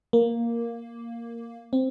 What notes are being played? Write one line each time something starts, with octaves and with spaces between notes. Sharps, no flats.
A#3
C4